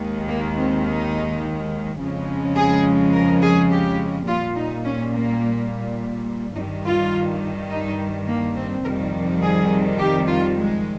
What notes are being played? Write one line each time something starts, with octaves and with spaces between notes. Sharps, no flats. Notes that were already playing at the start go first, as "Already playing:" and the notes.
Already playing: D#2 D#3 G#3
A#3
C4
D#4
F2 C#3 F3 G#3
G#4
A#4
G#4
G4
A#2 G3 F4
D#4
C#4
A#3
G2 D#3 G3 D#4
F4
D#4
A#3
C4
F2 C3 D#3 G3 A#4
G#4
G4
F4
G#3